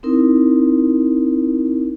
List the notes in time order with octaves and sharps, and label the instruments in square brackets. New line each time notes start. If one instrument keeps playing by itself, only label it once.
[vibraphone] C4 D#4 E4 A#4